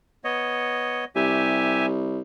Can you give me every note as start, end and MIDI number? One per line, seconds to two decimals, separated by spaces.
0.24 1.05 59
0.24 1.05 73
0.24 1.05 75
1.15 2.20 36
1.15 1.86 67
1.15 1.86 76
1.15 1.86 80